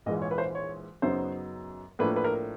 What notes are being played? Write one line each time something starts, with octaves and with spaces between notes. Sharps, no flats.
A#1 G#2 E3 G#3 D#5
C#5
B4
C5
C#5
F#2 C#3 F#3 B3 D#4 C5
A2 F3 A#3 D4 B4
B4
A#4